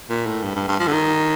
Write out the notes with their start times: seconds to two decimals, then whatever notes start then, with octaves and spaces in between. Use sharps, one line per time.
0.10 A#2
0.26 A2
0.43 G2
0.56 G2
0.68 G2
0.80 F3
0.87 D3
0.93 D#3